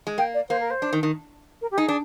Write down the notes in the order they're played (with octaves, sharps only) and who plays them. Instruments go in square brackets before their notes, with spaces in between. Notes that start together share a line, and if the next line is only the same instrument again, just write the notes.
[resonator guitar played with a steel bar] G#3
[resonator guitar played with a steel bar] A#3 [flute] G5
[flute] D5
[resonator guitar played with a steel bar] A#3 [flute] C5
[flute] A#4
C5
[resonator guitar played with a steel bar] D4
D#3
D#3
[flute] A#4
G4
[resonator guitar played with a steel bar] D#4 [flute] G#4
[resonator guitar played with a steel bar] D4